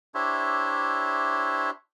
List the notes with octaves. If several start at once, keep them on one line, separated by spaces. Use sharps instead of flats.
D4 E4 G4 C5 C#5 E5